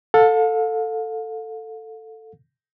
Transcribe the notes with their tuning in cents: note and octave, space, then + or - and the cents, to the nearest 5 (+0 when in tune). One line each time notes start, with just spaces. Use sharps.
A4 +10 F5 +40